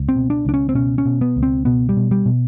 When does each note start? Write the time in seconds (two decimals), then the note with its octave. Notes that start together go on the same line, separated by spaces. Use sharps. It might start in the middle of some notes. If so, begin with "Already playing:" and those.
Already playing: C#2
0.09 C4
0.16 B2
0.30 D4
0.45 C#2 D4
0.54 C#4
0.69 C4
0.75 B2 C#4
0.98 C#4
1.06 B2
1.21 B3
1.36 C#2
1.43 C4
1.65 B2 B3
1.89 G3
1.96 B2
2.11 G3
2.26 B2